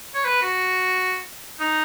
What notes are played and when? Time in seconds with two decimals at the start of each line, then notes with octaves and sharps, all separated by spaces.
0.15 C#5
0.25 B4
0.42 F#4
1.60 D#4